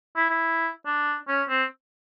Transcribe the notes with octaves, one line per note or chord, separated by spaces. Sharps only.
E4
E4
D4
C#4
C4